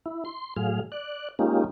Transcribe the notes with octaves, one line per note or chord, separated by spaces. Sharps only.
E4
C6
A2 F#3 G#4 F5
D5 F#6
G#3 A#3 C#4 D#4 F4 G4